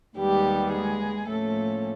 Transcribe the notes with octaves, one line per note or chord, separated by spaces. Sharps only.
D#2 D#3 G3 G#3 B3 G4
G#3 G#4
A2 F3 A3 A#3 C#4 A4